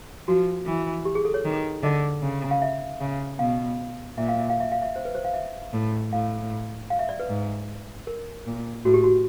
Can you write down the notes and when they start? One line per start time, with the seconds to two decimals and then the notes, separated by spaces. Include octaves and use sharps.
0.28 F3 F#4
0.66 E3
1.05 G4
1.15 G#4
1.25 A4
1.34 C#5
1.45 D#3
1.83 D3 D#5
2.22 C#3
2.51 F5
2.62 E5
3.00 C#3
3.39 B2 F5
4.17 A#2 E5
4.28 F5
4.39 E5
4.50 F5
4.60 E5
4.72 F5
4.82 E5
4.96 C5
5.05 B4
5.15 C5
5.25 F5
5.33 E5
5.73 A2
6.12 A2 F5
6.90 F5
6.99 E5
7.09 D5
7.20 B4
7.29 G#2
8.07 A#4
8.46 A#2
8.85 A2 F#4
8.94 G4
9.04 F#4